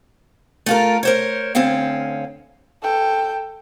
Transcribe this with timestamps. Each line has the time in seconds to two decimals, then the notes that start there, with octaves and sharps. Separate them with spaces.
0.66 A3 F4 A#4
1.03 A#4 C5 C#5
1.55 D2 C4 C#4 F5 F#5
2.83 A4 G5